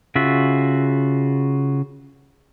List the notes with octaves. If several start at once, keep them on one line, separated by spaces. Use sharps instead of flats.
C#3 F4 F#4 E5